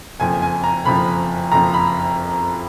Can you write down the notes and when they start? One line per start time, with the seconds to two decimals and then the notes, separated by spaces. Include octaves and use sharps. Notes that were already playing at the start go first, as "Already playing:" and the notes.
0.20 F#1 F2 F3 G#5
0.42 G#5
0.64 A#5
0.86 F#1 F2 F3 B5
1.52 F#1 F2 F3 A#5
1.74 B5